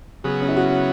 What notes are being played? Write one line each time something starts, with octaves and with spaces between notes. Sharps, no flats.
C#3 F#3 B3 G#4
C#4
E4
F#4